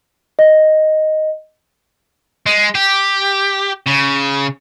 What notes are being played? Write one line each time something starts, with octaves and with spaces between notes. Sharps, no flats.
D#5
G#3
G4
C#3